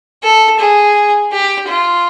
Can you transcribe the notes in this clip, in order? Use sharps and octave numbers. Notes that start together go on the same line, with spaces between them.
A4
G#4
G4
F4